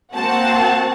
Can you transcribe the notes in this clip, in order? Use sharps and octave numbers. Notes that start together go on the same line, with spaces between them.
A#3 C4 F#4 F#5 A5